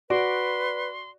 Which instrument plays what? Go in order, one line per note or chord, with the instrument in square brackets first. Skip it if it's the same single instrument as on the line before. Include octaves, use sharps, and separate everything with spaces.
[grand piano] F#4 [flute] B4 [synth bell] D5 [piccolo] C6